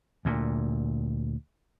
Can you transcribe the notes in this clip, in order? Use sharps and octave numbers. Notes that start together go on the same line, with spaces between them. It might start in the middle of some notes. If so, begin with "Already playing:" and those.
D2 A#2